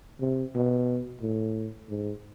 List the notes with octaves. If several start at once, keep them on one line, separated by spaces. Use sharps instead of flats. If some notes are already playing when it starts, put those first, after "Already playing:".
C3
B2
A2
G#2